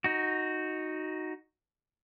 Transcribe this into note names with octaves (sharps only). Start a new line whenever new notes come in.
D#4 F#4